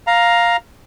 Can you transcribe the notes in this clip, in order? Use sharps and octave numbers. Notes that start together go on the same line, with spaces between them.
F5 A#5